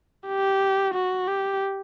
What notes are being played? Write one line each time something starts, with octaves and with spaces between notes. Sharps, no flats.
G4
F#4
G4